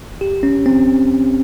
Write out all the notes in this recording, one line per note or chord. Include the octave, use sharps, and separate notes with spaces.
G4
C#4
C4